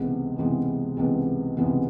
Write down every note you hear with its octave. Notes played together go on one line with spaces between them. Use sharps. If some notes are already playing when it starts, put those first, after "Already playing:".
Already playing: C#2 C3 E3 G#3 B3
C#2 C3 E3 G#3 B3
C#2 C3 E3 G#3 B3
C#2 C3 E3 G#3 B3